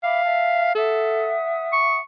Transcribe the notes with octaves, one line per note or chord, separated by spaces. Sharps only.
E5 F5 B5 D6
E5 A5 F6
A4 E5 F#5 D#6
C#6